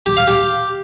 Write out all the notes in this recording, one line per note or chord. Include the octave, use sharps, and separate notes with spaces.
G4
F5
G4